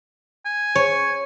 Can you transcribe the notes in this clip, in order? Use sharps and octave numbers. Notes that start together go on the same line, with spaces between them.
G#5
C#5